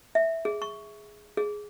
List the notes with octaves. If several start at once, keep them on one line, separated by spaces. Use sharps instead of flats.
E5
G#4
C#6
G#4